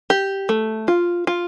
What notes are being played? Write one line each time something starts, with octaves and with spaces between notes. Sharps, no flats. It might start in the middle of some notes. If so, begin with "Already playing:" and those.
G4
A3
F4
F4